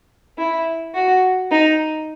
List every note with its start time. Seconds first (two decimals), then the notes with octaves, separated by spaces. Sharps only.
0.38 E4
0.94 F#4
1.52 D#4